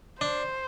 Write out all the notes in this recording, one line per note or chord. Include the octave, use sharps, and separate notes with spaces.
D4 C5